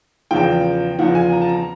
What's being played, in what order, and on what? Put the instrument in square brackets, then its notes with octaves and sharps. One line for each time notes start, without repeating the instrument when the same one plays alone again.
[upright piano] E2 C#3 F3 G5
E2 C#3 F3 F#5
G#5
A#5
A5
A#5